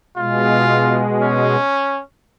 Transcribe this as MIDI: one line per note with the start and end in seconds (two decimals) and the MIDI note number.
0.18 1.57 47
0.18 1.57 56
0.18 1.03 65
1.23 2.01 61